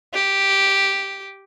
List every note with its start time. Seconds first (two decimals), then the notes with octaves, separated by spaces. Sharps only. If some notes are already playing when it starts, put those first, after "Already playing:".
0.14 G4